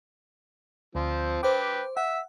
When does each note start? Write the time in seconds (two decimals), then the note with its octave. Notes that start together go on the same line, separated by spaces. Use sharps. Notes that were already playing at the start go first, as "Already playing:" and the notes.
0.95 D2 F3 C4
1.43 B4 C5 G5 D6
1.97 E5 F#5